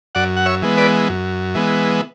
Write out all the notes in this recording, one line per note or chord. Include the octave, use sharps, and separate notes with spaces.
F#2 D5 F#5
F#5
C#5 E5
E3 G#3 B3
B4 D5
F#2
E3 G#3 B3